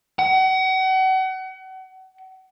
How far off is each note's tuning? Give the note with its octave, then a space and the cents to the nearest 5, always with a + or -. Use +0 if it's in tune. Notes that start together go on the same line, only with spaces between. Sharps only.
F#5 +35